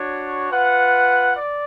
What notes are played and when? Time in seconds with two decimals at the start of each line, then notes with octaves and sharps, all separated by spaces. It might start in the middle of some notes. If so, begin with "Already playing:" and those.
Already playing: D4 F#4 C#5
0.49 F4 B4 F#5
1.35 D5